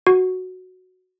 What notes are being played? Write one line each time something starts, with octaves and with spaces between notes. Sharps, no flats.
F#4